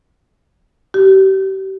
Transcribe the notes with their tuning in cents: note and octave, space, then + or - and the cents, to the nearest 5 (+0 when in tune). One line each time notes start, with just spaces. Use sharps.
G4 -35